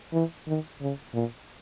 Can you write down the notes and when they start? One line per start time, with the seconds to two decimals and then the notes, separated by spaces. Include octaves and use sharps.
0.13 E3
0.47 D#3
0.81 C#3
1.14 A#2